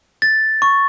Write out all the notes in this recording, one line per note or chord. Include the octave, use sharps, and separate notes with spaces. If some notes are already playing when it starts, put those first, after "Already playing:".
A6
C#6